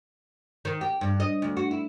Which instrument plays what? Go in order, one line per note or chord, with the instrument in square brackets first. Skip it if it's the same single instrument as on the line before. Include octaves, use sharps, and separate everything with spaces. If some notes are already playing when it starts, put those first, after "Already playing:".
[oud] D#3
G4
G2
D#5
D2
F#4
E4